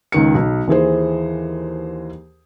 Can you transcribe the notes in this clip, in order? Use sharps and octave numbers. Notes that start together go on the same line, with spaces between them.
C#2 D#3 C#7
B1
D#2 E3 G#4 C5